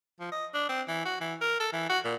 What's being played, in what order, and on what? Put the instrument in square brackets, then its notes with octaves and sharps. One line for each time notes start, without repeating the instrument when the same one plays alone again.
[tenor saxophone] F3
D#5
D4
C4
E3
F#4
E3
A#4
A4
E3
F#4
A#2